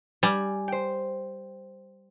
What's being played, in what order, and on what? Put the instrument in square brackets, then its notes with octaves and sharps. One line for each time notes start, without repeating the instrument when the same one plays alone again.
[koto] G3 [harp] G#5
[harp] C5 G5